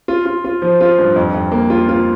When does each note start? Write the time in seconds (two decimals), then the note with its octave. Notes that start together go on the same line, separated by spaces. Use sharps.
0.08 F4
0.26 F4
0.44 F4
0.62 F3
0.81 F4
0.99 G2
1.16 F2
1.34 F2
1.52 A#3
1.70 F4
1.89 F4